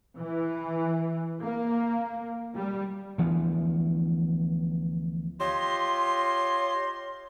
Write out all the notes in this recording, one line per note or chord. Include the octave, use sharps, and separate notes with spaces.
E3
A#3
G3
D2 E3 F3 B3
F4 G4 C#5 D#5 C6